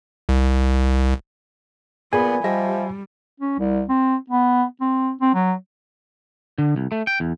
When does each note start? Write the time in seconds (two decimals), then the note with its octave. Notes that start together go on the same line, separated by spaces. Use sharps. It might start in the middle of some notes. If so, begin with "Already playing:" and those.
0.29 C2
2.13 A#2 B3 G#4 G#5 B5
2.44 F3 G3 G4 D#5 E5
3.40 C#4
3.59 C2
3.89 C4
4.30 B3
4.81 C4
5.21 C4
5.34 F#3
6.58 D3
6.76 C2
6.92 A3
7.07 G5
7.20 E2